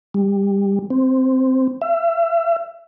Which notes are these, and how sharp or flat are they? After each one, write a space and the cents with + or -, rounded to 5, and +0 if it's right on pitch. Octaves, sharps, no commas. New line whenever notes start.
G3 +20
C4 -5
E5 +35